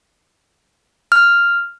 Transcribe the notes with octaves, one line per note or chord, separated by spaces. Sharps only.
F6